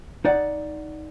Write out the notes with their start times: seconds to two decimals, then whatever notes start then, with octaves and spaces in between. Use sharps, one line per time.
0.25 D#4 D5 F#5